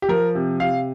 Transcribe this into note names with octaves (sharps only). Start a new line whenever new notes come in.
G4
F3 A#4
C3
C3 F5